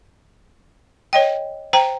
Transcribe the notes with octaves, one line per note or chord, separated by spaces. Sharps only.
C#5 D#5 G5
C5 G5 A#5